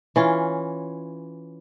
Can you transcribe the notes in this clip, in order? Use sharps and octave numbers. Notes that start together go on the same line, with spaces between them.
E3 C#4 F4